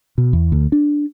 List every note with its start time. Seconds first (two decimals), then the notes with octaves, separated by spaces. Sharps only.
0.18 B2
0.33 E2
0.52 D2
0.72 D4